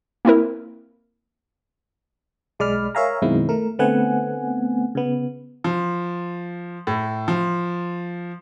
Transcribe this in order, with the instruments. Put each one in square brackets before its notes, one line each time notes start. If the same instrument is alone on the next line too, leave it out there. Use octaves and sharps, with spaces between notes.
[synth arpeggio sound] A#3 C4 E4 A#4
[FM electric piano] B1 G#3 D5 B5 F6
A#4 C#5 E5 F5 G#5 A#5
F#2 B2 D#3 G#3 C4 E4
A3 A#4
D3 A3 B3 C4 F#5 G#5
C#3 B3
[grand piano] F3
A2
F3